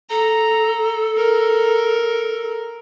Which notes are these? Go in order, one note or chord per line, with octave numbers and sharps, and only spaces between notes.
A4 A#5
A#4